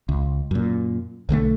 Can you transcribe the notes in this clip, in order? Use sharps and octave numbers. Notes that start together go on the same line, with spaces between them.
C#2
F#2 A#2
B1 D3 G3 A3